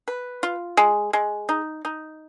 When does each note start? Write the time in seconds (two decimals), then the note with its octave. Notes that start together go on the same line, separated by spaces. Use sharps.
0.08 B4
0.43 F4
0.77 G#3
1.13 G#3
1.49 D#4
1.85 D#4